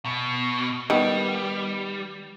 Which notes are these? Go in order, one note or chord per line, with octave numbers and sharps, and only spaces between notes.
B2
D#3 G3 B3